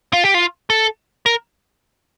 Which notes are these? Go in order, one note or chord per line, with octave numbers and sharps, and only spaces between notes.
F4
G4
F4
A4
A#4